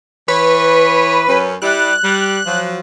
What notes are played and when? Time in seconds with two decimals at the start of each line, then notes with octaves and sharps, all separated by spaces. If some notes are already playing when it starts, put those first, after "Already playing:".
0.28 E3 B4 C#5
1.27 F#2 C#4
1.62 G3 E4 F#6
2.03 G3
2.46 F3 F#3